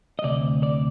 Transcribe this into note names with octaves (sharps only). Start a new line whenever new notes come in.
D#5
D2 C3 D5
D5